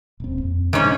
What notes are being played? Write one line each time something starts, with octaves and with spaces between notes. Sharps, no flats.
D#1 C4
F2
G#2 D3 D#3 C#4